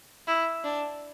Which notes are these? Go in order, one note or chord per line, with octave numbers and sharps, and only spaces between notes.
E4
D4